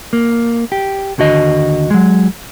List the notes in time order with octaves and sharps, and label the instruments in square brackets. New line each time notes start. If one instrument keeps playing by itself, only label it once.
[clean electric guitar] A#3
G4
D#2 D3 F#4 D#5
F#3 G#3